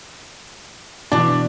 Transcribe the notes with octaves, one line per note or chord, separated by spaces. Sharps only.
B2 E3 D4